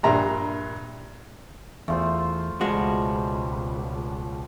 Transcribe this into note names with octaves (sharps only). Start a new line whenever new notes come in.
A#1 G2 E5 A#5 C6
E2 A3 F4 C5
C#2 B2 F3 G3 G#3 F#4